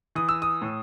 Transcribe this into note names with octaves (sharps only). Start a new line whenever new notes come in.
E3 D#6
E6
D#6
A2